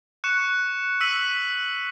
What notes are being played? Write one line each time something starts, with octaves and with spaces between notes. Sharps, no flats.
C#6 F#6 C#7 E7
E6 B6 D#7 F#7